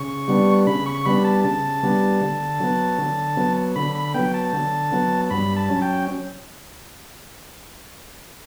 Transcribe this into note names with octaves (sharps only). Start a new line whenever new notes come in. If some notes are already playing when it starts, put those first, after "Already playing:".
Already playing: C#3 C#6
G3 B3 D4
C#3 B5
C#6
G3 B3 D4 B5
A5
C#3 A5
G3 B3 D4
D3
F#3 B3
D3
F#3 B3
D3 B5
B5
F#3 B3 G5
A5
D3
F#3 B3
G2 B5
A5
F#3 C#4
G5